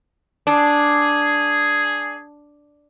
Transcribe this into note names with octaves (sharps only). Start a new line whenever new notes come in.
D4 G#4